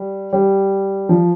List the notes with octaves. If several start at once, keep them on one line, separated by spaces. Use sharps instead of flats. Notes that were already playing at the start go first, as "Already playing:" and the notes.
Already playing: G3
G3
F3